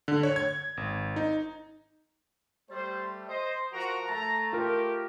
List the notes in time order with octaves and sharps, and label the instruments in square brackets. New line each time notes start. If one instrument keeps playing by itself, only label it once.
[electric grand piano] D3
C#5
G#6
G#1
D#4
[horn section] G3 A3 [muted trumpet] C5
[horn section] C5 [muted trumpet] D#5
[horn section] F3 A#4 A#5 [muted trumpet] F#4
[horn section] A3 [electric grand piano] A5 [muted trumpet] A#5
[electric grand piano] F4 A#4 [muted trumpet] G4